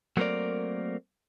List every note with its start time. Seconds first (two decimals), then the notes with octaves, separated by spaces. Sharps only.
0.17 F#3 A3 A#3 C4 A#4 D5